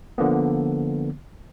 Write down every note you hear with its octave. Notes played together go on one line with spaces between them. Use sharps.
D3 F3 A#3 B3